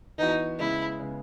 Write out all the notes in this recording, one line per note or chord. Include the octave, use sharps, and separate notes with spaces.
E3 B3 D#4 F#4
C#3 G#3 B3 E4
C#3 G#3 B3